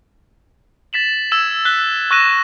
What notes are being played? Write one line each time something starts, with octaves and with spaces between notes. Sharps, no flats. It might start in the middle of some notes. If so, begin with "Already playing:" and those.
A6 B6 E7 F#7
E6 G#6 E7
F#6 B6 G7
C#6 E6 F#6 A#6 D#7 E7